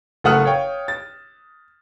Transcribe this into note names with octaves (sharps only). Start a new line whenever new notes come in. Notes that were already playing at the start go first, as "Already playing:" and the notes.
F#1 A3 F#5 D#6 F6
C#5 F5 G5
A6